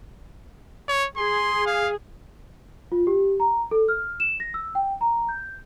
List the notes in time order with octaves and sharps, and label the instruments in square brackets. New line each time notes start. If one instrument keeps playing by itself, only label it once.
[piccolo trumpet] C#5
[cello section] G#4 [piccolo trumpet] C6
[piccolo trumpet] F5
[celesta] F4
G4
A#5
A4
F6
E7
A#6
E6
G5
A#5
G6